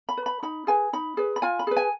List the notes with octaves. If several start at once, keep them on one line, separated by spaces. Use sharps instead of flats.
B5
B4
B5
D#4 B5
G#4 B4 G#5
D#4 B5
G#4 B4
B5
F4 G#5
B5
G#4 B4
G#5